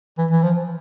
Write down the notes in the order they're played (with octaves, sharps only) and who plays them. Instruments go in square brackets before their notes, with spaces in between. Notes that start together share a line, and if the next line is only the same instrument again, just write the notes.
[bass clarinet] E3
E3
F3